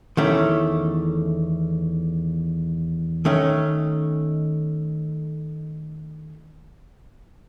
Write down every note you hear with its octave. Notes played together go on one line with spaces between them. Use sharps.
E2 D#3 A3 C#4 E4
D#3 A3 C#4